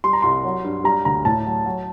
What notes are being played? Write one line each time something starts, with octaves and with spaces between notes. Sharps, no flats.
G3 C6
A#5
C2 C6
F#3
G2
G3 A#5
D2 A#5
A2 A5
F#3
F#3